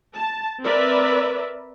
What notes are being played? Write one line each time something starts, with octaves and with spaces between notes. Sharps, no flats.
A5
C4 A#4 B4 D5 E5